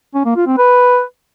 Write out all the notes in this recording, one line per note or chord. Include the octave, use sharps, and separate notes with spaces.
C#4
A#3
F4
C4
B4